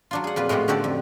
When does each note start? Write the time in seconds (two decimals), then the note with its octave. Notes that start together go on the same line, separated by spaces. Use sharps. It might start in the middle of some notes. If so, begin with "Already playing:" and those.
0.11 F#3 D4 F4
0.24 G#4 F#5
0.36 F2 A#2 F4 B4
0.49 A2 G#3 B3 F#4 G4
0.68 D3 C#4 F#4 G4 A4 D5
0.84 F2